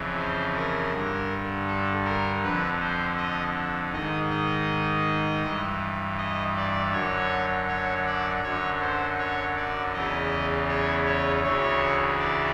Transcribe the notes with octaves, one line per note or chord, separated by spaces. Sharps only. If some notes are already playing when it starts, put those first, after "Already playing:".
Already playing: F2 C#3 E3
C5
A#4
G2 D3
A4
A#4
F2 D3 B4
C5
D#5
G#2 D#3 D#5
D#5
G2 E3
D#5
D5
F#2 D3 C#5
C#5
D5
F#2 D3 C#5
C5
C#5
D5
E2 C#3 E3 D#5
C#5
C#5
D2 C#3 E3 C#5
D5